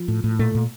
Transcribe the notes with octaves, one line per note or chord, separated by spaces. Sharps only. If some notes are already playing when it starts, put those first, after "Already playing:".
Already playing: F3
A2
A2
A#2 A3
A#2